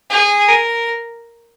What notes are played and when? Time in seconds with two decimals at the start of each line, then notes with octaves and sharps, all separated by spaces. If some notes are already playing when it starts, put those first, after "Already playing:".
0.10 G#4
0.48 A#4